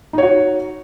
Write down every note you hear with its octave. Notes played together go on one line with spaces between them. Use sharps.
D#4 F#4 C#5